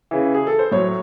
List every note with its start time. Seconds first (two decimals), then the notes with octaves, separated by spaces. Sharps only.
0.11 C#3 E3
0.35 G#4
0.47 A4
0.59 C5
0.71 A2 F#3 C#5